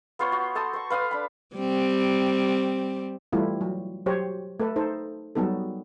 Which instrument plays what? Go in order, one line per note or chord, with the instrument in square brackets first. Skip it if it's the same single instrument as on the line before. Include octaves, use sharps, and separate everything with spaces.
[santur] B3 F4 C5 C#5
F#4
A4 A5 C6 D#6
C5 C#6
B4 F5 C6 D#6
D4 B5
[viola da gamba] G3 C4
[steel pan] E3 G3 A3 E4 F4
F#3
F#3 G4 C5 C#5
A3 A4 B4
D#4 A4 C5
F#3 G3 B3 D#4 A4